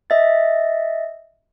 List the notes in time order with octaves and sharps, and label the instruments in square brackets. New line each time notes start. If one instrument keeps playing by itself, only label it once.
[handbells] D#5 E5 A6